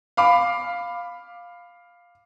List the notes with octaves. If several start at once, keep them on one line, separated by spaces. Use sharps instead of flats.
F5 B5 D6